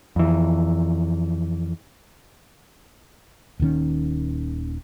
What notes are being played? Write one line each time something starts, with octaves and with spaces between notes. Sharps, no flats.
F2 E3
D#1 A#2 D#3 C#4